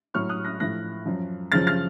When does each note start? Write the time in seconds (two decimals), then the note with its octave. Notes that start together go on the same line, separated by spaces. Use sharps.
0.14 A2 F#3 C#6 F6
0.29 D#6 F#6
0.44 F#6 A#6
0.60 A2 F3 F#6 A#6
1.05 F#2 F3
1.52 F#2 C#3 F3 F6 A6
1.67 F6 A6